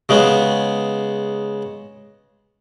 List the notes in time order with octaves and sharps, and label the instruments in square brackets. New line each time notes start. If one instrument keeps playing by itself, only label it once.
[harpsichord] C#3 G#3 B3 C#4